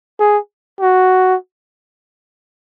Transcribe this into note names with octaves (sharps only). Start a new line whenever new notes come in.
G#4
F#4